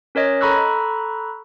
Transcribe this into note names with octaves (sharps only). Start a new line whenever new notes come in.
C#4 A#4 C#5 D#5
A4 A#5 B5 C#6 E6 F#6